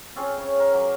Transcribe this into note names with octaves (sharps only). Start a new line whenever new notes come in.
C4 C#4 F4 G#4
C#3 C#5
A#4
F#3 D6